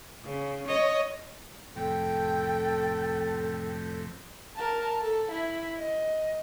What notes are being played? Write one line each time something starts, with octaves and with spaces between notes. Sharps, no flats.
C#3
C#5 D#5
F2 A2 C3 A4 G5
A#4 A5
A4
E4
D#5